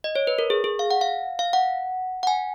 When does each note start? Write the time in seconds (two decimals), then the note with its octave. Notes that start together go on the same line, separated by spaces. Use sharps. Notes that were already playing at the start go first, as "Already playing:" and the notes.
0.04 D#5
0.15 C#5
0.27 B4
0.38 A#4
0.50 G#4
0.64 G#4
0.79 F5
0.91 F#5
1.01 F5
1.39 F5
1.53 F#5
2.23 F#5
2.27 G#5